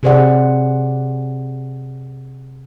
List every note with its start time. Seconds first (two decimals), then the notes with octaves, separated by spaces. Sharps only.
0.03 C3 G4 G#4 C5 D5 F#5